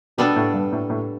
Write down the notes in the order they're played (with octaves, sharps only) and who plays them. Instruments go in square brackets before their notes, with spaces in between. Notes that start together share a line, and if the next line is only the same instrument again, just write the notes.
[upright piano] B2 [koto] G3 B3 D4 A4
[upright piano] A2
G2
A2
A2